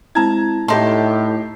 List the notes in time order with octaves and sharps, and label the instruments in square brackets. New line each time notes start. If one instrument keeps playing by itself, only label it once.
[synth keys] G#3 C4 E4 [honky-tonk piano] A5 A#5 G#6
[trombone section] A2 [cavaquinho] D#4 C6 [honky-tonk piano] G4 A5 [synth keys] C7